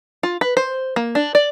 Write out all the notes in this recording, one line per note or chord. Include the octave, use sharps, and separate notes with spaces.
F4
B4
C5
A#3
D4
D5